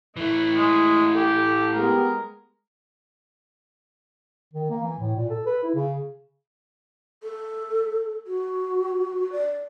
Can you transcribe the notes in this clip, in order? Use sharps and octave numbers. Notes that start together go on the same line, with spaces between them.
E3 A3 E4
G#3
G4 A4
G#3 B3 G4 A#4
D#3
A#3
E3
A2
A#2
A4
B4
E4
C#3
A4
F#4
D5